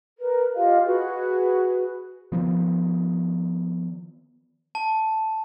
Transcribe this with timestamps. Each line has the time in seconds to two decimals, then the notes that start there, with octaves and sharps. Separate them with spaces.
0.18 A#4 B4
0.56 F4 G4 D#5 F5
0.85 F#4 G#4 B4
2.32 D#3 F3 B3
4.75 A5